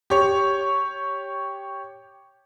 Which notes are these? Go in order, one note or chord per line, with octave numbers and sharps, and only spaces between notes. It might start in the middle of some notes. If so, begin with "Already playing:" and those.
G4 C#5